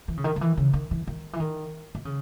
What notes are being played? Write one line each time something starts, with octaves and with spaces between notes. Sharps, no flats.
E3
C#3
D#3
D#3
E3
C#3
D#3
E3
D#3
E3
D#3
D#3
C#3